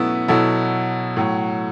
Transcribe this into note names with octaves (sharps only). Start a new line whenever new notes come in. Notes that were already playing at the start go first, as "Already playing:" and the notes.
Already playing: B2 F#3 A3 B3 C#4 E4
B2 F#3 E4 A4
A2 F#3